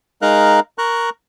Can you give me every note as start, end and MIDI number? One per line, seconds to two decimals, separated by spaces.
0.22 0.60 56
0.22 0.60 63
0.22 0.60 70
0.22 0.60 77
0.22 0.60 82
0.22 0.60 90
0.78 1.10 70
0.78 1.10 82
0.78 1.10 85
0.78 1.10 90